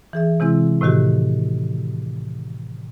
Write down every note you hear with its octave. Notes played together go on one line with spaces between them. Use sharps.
E3 G#4 E5
C3 E3 G#3 C4 E4
A2 C3 D#3 F#4 G4